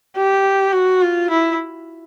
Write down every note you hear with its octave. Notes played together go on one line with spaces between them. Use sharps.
G4
F#4
F4
E4